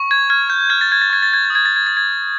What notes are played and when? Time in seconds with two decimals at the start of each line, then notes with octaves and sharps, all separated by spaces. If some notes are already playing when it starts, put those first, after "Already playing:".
Already playing: C#6
0.11 G#6
0.30 F6 G#6
0.50 G6
0.70 F6 G#6
0.81 A6
0.92 G#6
1.02 A6
1.10 C#6 G#6
1.23 A6
1.34 G#6
1.45 A6
1.50 D#6
1.55 G#6
1.66 A6
1.76 G#6
1.87 D#6 A6
1.97 G#6